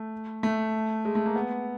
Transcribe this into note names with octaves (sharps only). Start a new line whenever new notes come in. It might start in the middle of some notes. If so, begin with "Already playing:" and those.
Already playing: A3
A3
G#3
A3
A#3
B3